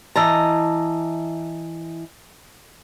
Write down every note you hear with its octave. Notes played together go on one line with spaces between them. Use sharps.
E3 D#5 A5 A#5